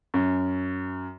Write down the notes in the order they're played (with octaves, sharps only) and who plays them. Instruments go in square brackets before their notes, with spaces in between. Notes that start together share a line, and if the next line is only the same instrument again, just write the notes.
[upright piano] F#2